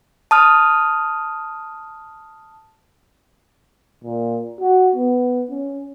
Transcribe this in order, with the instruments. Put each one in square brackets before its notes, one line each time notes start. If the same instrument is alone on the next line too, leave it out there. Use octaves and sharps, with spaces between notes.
[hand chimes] A5 D#6 F6
[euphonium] A#2
F#4
B3
C#4